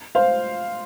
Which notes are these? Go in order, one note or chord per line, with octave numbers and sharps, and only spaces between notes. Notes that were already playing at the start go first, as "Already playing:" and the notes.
C5 F5